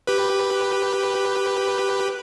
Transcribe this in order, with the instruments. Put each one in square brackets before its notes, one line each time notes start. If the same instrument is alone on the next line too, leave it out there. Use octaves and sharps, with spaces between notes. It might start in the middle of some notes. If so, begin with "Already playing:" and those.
[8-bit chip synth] G4 B4